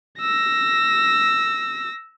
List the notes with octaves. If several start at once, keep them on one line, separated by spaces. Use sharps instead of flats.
E6 A#6